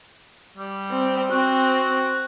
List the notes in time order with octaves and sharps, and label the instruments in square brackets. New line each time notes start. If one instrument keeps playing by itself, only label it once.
[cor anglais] G3
[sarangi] C4
[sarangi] C4 [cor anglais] F#4